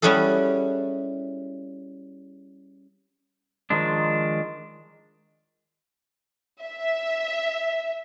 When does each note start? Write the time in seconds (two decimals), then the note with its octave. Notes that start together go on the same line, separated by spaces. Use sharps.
0.02 G3 C#4 E4 F#4 G#4 A4
3.70 D#3 F3 G#3 D4
6.64 E5